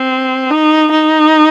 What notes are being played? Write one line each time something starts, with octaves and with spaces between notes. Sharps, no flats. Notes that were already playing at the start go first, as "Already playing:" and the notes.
Already playing: C4
D#4
D#4